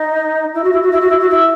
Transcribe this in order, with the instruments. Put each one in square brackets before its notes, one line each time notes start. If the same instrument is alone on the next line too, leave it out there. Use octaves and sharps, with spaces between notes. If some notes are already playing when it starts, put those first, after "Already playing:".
Already playing: [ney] D#4
E4
F#4
E4
F#4
E4
F#4
E4
F#4
E4